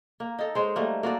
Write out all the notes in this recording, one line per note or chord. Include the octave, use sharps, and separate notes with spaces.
A#3
D#4 A4
G#3 C5 C#5
G3 A3 A#3
A#3 F#4 A4 D5